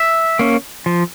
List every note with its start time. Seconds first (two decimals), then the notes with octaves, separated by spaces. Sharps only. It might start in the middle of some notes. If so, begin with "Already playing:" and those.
Already playing: E5
0.39 A#3 C#4
0.86 F3